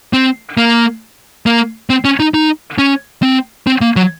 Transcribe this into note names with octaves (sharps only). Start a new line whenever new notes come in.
C4
A#3
A#3
C4
C#4
D#4
D#4
C#4
C4
C4
A#3
F#3